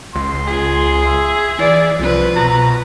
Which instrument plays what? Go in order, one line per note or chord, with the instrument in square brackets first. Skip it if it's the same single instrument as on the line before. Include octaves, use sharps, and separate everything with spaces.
[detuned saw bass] C#2 [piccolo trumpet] C6
[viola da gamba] F4 [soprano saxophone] G#4
[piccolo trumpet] E5
[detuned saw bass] E3 [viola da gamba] D5
[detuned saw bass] C2 [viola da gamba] F3 B4
[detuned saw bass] B2 [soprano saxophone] A#5